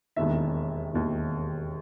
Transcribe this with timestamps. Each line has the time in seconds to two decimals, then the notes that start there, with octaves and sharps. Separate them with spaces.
0.16 E1 D#2 D#3 E5
0.93 E1 D#2 D#3